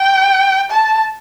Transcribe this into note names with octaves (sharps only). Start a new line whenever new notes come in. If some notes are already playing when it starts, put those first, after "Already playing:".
Already playing: G5
A5